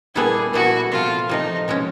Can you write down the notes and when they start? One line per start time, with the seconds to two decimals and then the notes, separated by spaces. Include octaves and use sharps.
0.15 A#2 G3 B3 E4 G#4 A4
0.53 A#2 G3 B3 E4 F#4 A4
0.92 C3 F3 A3 F4
1.29 C3 F3 A3 D#4
1.68 B2 G#3 C#4